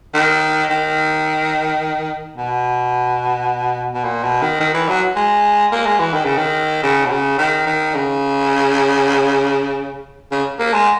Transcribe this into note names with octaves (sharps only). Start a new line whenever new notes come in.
D#3
D#3
B2
B2
A#2
B2
D#3
D#3
E3
F#3
G#3
A#3
G#3
E3
D#3
C#3
D#3
C#3
B2
C#3
D#3
D#3
C#3
C#3
A#3
G#3